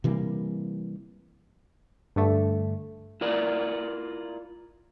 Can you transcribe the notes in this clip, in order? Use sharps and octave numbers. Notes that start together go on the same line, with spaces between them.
C3 E3 G3 A#3
G2 D3 A3
E4 F4 A#4 D5